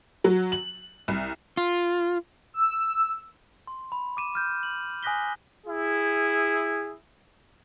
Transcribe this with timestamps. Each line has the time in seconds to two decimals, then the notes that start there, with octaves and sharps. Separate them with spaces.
0.24 F#3
0.52 F#7
1.08 C2
1.57 F4
2.54 E6
3.67 C6
3.92 B5
4.17 D6 D#7 E7
4.34 D6 F6 G6
4.63 F#7
5.03 G#5 D#6 F#6 A#6 B6 G7
5.67 E4 G#4